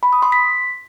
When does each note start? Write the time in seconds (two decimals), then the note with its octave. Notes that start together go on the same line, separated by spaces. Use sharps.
0.03 B5
0.13 D#6
0.22 C6
0.32 B6